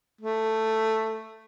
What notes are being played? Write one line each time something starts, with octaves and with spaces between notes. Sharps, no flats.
A3